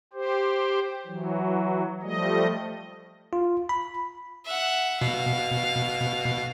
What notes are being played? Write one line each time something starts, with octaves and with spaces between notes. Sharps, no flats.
G4 C5
E3 F#3
F3 G3 A3 D#5
F4
B5
E5 F#5
B2 F5